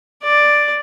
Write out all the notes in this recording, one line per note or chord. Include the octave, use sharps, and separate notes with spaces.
D5